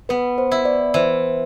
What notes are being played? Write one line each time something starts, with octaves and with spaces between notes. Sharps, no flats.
B3 B4
C5
E4
D5
E3 C5